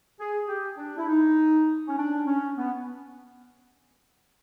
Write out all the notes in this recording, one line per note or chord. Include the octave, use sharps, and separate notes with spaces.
G#4
G4
D4
E4
D#4
C#4
D4
C#4
B3